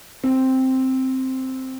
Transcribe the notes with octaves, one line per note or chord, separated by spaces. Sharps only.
C4